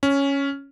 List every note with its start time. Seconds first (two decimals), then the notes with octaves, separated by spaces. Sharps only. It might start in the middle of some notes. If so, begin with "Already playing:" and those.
0.03 C#4